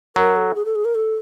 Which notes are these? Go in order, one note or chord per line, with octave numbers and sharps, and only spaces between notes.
F#3 A#4
A4
G#4
A4
G#4
A#4
A4